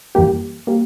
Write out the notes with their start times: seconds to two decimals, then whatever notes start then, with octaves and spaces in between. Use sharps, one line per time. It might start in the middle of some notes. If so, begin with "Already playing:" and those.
0.15 F#2 E3 G3 A#3 G4
0.67 G3 A#3